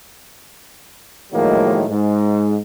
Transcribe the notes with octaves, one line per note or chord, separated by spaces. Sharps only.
A2 D#3 F3 F#3 G#3 A#3
G#2